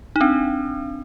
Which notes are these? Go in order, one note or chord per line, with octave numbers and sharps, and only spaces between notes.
D#4
C4 D4